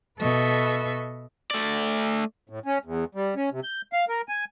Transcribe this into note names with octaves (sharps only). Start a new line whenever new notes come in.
B2 A4 B4 D#5 E5 C#6
A3 D5
A2
C#4
E2
G3
C#4
C3
G6
F5
A#4
G#5